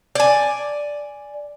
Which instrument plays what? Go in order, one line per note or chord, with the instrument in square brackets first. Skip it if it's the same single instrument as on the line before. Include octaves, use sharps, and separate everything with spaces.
[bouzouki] D5 G#5